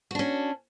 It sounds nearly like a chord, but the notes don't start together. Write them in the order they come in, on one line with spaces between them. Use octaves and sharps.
F#4 D4 C#4